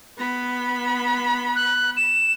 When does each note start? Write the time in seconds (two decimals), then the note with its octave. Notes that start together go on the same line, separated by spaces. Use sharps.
0.19 B3 B5
1.55 F#6
1.96 E7